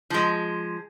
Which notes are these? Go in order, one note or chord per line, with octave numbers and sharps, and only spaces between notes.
F3 G#3